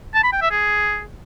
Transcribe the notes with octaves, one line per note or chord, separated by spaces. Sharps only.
A5
B5
G5
E5
G#4